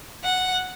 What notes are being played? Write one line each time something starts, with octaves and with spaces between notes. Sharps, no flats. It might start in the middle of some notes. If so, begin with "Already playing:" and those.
F#5